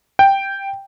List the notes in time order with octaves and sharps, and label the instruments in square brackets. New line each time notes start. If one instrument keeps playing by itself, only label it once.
[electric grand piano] G5